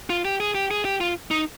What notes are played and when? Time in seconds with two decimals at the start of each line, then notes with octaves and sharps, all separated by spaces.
0.10 F4
0.25 G4
0.40 G#4
0.55 G4
0.71 G#4
0.85 G4
1.00 F4
1.31 D#4